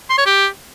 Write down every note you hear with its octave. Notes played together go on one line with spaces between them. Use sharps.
C6
C#5
G4